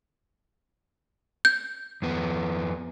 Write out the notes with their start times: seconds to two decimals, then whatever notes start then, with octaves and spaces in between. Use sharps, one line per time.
1.45 G6
2.02 F2 B3